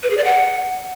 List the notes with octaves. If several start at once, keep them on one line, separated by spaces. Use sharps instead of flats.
B4
G#4
D5
F#5